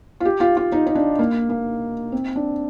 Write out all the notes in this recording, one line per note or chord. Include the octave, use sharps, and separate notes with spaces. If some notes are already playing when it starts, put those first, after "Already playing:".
F4
G4
F4
F4
D#4
D#4
D4
A#3
A#3
C4
D4